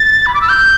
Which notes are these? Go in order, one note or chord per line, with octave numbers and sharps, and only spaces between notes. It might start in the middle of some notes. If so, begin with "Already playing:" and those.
Already playing: A6
B5
D6
E6
G6